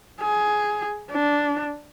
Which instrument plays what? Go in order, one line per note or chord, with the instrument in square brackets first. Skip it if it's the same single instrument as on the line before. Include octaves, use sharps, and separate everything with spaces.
[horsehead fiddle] G#4
D4